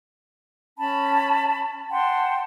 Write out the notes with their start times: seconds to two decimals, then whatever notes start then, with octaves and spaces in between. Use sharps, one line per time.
0.77 C#4 A5 B5
1.91 F#5 G5 A5 C6